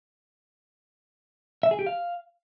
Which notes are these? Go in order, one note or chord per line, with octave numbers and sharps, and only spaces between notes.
E5
G#4
G4
F5